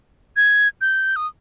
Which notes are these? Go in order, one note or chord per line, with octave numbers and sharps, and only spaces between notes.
G#6
G6
D#6